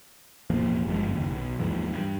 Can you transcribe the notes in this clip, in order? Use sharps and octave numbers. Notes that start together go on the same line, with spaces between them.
E1 A1 F3 A#3
G1 G2 F3 G#3
F#1 D#2
B1
D#2 G#2 E3 F3
G2